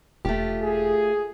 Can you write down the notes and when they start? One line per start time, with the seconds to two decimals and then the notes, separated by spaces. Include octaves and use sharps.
0.25 E1 A3 F4 G4
0.62 G#4